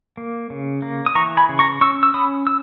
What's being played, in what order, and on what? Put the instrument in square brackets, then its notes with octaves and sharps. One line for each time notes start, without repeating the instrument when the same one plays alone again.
[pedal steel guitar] A#3
C#3
A#3
D#6
E3 A#5 C#6
G#5 B5
C#3
A#5 C#6
C#4 C#6 E6
E6
C#4 B5 D#6
E6